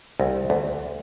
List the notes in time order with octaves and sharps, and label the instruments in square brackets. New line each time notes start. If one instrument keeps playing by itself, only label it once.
[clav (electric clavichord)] C2
D2